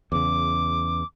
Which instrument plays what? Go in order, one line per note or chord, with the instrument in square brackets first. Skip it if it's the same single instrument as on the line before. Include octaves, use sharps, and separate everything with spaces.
[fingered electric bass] E2 C#3 [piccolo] D6